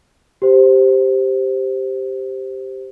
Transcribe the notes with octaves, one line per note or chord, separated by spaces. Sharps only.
G4 C5